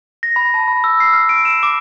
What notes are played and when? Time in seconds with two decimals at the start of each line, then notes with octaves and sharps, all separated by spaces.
0.23 A#6
0.36 B5
0.54 A5
0.68 B5
0.84 E6
1.00 C7
1.13 F6
1.29 D7
1.45 E7
1.63 D6